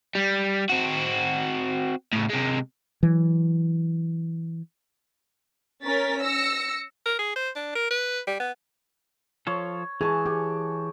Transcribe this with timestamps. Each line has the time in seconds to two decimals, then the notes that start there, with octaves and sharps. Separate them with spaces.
0.15 G3
0.69 C4 F#4
2.13 A2 C#3
2.29 C3 G#3
3.03 E3 F#3
5.84 C#4 A#4 A6 B6
6.22 E6 A#6 C#7
7.05 A#4
7.19 G#4
7.36 C5
7.55 D4
7.75 A#4
7.90 B4
8.27 G3
8.40 B3
9.47 F3 F4 A4 C#5
10.01 E3 G#4 G#5 A5 C#6
10.26 G4 G#4